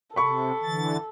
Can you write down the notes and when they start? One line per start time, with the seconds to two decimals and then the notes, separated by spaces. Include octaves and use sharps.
0.16 C3 A4 B5 C#6
0.63 D3 E3 A6